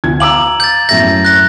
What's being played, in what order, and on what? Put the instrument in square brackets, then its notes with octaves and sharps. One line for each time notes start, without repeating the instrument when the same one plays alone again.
[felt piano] D2 G#6
[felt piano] F5 D6 E6 [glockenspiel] A#5 F#7
[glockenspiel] G6 A6
[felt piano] F#2 A2 E5 [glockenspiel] G6 A#6
[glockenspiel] F#6 A#6